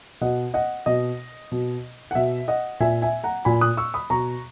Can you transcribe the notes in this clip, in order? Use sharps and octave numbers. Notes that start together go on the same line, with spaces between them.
B2 D#5 F#5
D#5 F#5
B2 D#5
B2
F#5
B2 E5
D#5 F#5
A#2 E5 G#5
E5 G#5
F#5 A#5
A#2 G#5 B5
D#6 F#6
C#6 E6
B5 D#6
B2 A#5 C#6